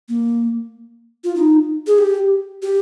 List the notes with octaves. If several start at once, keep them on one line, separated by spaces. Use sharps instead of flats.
A#3
F4
D#4
G#4
G4
G4